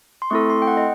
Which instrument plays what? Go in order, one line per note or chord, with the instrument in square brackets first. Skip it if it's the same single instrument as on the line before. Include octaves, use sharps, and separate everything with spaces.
[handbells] C6
A3 C4 E4 A4 C#6
C6
G5
F#5
D#5